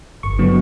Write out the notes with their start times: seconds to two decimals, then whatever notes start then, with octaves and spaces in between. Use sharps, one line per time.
0.23 G1 C#6
0.39 D3 F#3 B3